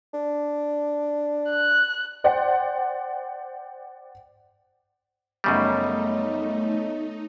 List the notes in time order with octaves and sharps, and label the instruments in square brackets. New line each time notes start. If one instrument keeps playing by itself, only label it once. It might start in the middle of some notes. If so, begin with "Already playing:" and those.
[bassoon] D4
[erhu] F#6
[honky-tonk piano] C5 D5 F#5 G5
[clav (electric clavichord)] F#2 C#3 G3 [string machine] A3 D#4 [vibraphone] B3 C#5 D#5
[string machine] D#4